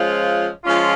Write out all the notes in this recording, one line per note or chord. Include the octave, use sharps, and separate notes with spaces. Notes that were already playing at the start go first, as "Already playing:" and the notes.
Already playing: F3 G#3 C#4 F4
F3 G#3 C#4 F4